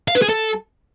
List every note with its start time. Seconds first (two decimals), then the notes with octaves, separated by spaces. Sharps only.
0.08 F5
0.15 B4
0.22 G#4
0.29 A4